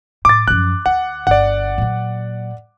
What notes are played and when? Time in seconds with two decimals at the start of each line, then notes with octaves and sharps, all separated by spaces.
0.25 A2 D6 A6
0.48 F#2 F3 F#6
0.86 D2 F#5
1.27 G1 D5 F#5
1.78 A#2 F#3